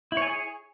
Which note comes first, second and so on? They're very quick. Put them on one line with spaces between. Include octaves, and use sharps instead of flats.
E4 C#5 G#5 G#4